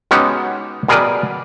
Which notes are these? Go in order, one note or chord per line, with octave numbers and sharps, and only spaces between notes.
G#3 B3 C#4 D#4 F#4 G4
B2 G3 G#4 A#4 B4 D5